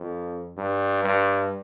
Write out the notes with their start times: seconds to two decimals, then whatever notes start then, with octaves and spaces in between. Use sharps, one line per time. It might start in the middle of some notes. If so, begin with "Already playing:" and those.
Already playing: F2
0.57 G2
1.05 G2